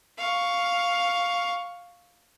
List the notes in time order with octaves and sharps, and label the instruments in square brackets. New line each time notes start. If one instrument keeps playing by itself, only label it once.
[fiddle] F5 C#6